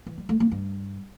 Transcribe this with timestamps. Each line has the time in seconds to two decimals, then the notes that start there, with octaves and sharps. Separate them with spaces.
0.07 E3
0.18 G3
0.29 A3
0.40 A#3
0.52 G2